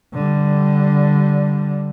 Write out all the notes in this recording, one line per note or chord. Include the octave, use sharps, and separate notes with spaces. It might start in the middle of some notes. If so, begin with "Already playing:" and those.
D3 G3